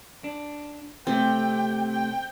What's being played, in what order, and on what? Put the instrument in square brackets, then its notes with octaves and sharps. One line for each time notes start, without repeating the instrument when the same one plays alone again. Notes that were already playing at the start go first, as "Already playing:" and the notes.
[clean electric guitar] D4
[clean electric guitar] C3 A3 G4 [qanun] C4 [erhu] G5
[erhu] G5